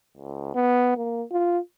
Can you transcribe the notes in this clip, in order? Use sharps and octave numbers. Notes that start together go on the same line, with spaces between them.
C#2
B3
A#3
F4